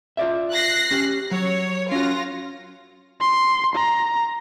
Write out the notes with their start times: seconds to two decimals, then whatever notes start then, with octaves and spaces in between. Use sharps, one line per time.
0.17 F4 D5 E5
0.52 F#6 A#6 C7
0.91 C#4 G4
1.31 F#3 C#5
1.91 C#4 F4 F#4 A#6
3.20 C6
3.75 A#5